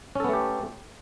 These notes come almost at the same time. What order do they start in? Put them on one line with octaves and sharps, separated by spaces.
C#4 A4 B3 A3 G4